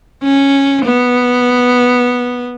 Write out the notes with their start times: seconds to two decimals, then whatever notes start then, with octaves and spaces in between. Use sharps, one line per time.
0.24 C#4
0.85 B3